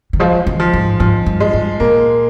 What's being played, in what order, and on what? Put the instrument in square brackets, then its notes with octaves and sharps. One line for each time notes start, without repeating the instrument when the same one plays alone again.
[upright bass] D#3
[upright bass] F3 [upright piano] G#3
[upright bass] D#3
[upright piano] F3
[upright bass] G#2
[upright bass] G#2 [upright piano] F3
[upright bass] G2
[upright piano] G#3
[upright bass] G2
[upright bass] A#2 [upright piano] A#3